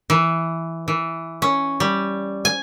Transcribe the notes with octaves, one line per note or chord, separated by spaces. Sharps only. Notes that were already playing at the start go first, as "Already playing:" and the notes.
E3
E3
C#4
G3
G#5